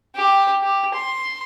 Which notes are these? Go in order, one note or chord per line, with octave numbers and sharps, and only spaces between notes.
G4
G4
C6